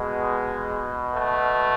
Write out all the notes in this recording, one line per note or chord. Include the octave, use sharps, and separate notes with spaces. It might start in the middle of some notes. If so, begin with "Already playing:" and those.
Already playing: B2 G#3
A3